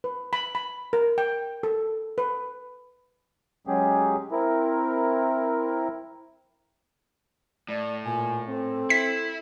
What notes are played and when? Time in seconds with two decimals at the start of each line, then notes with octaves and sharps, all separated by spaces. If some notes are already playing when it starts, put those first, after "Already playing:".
0.04 B4
0.33 B5
0.55 B5
0.93 A#4
1.18 G5
1.63 A4
2.18 B4
3.67 F#3 G#3 C#4 G4 G#4
4.31 C4 E4 A#4
7.69 A2 D5
8.05 A#2 G#5
8.48 C4 A4
8.90 E4 B6